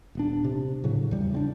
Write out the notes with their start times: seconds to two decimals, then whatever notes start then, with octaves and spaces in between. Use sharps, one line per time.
0.15 D#1 B3 D4
0.44 C3
0.84 A2 C#3 F#3
1.11 E2 G3
1.33 C#3 C4 D4